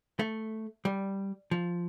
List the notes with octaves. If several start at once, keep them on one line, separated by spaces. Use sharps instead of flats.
A3
G3
F3